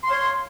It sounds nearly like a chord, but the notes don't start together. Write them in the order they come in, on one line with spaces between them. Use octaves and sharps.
C6 F5 C#5